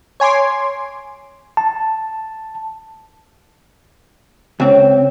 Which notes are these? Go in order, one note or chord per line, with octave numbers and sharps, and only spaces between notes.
C#5 G#5 C6 D6
A5
C#2 C4 C#4 C#5